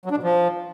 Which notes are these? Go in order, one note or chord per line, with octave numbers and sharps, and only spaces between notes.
F#3
D4
B2
F3